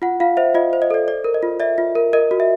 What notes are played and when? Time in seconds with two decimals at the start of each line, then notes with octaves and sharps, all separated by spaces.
0.02 F4 F#5
0.20 F4 F5
0.37 C5 E5
0.54 F4 D#5
0.73 C5
0.82 D#5
0.91 A4 D5
1.08 D5
1.24 A#4
1.34 D#5
1.43 F4
1.60 D5 E5
1.78 F4
1.95 A#4
2.13 A#4 D#5
2.31 F#4
2.40 E5